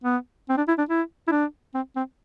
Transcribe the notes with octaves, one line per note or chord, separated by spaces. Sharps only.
B3
C4
D4
E4
D4
E4
E4
D4
C4
C4